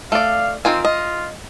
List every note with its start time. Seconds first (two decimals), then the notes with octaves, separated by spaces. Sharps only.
0.12 A3 D5 F5
0.65 D#3 C4 F4 G#5
0.85 F4 D#5